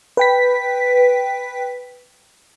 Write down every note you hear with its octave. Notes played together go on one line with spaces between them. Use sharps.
B4 G5 B6